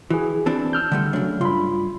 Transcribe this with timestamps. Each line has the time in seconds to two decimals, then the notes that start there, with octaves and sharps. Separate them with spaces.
0.10 E3 F#4 G#4
0.46 E3 C4 D4 A5
0.73 E6 F6 G6
0.92 D3 G3 A3
1.13 C#3 F#3 A3 D4
1.41 G2 F4 B5 C6